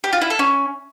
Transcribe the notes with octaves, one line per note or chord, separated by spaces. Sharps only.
G4
F4
E4
A4
C#4